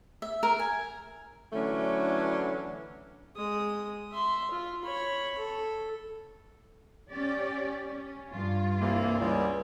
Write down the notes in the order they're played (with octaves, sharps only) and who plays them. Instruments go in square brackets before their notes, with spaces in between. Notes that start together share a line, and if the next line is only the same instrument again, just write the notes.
[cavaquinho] E5
A#4
G#5
[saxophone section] D3 E3 F#3 A3 C#4 D4
[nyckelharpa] G#3 D#6
E5 C6
F4
C#5 B5
A4
[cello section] C#4 G4 D5
C#4
G2 F4
[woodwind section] C2 E3 A#3
C#2 G3